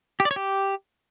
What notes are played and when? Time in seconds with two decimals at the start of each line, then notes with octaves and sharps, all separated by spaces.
0.20 G4
0.25 D5
0.31 C#5
0.36 G4